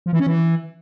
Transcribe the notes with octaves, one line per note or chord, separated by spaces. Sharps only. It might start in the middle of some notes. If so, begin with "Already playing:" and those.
F3
E3
C#4
E3